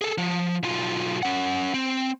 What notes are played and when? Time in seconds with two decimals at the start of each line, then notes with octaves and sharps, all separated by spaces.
0.01 G#4 A4
0.18 F3
0.63 B1 F4
1.23 C#4 F#5
1.74 C4